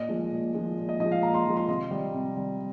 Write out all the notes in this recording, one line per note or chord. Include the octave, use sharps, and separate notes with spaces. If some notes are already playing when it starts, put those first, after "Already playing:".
Already playing: A#2 D#5
F3 G#3
A#2
F3 G#3
A#2
D#5
F3 G#3 D#5
F5
A#2 A#5
C6
F3 G#3
C6
C3 D#5
G3
C3
G3